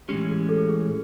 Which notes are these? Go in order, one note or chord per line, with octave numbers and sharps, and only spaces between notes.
A2 E3 G#3 C#4 G4
G#4
A4
G#4